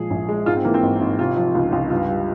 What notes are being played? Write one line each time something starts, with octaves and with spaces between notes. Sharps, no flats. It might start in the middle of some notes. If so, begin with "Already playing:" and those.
Already playing: A#2 F3 G#3 G#4
A#1
G#3
G#2 F4
C4
E3 A#3
C4
G#1
G#1
C3 F4
F3
C#2
C#2
G2 F4
G3